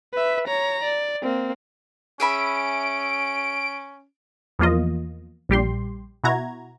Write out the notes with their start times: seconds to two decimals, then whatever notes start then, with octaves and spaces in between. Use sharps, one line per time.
0.12 B4 E5
0.48 C#5 A#5
0.84 D5
1.22 A#3 C4
2.20 C#4 G#4 E5 B5 D7
4.59 E2 F3 A#3 F4 D#5
5.49 A#1 G3 G4 C6
6.24 B2 E4 F#4 A#5 G#6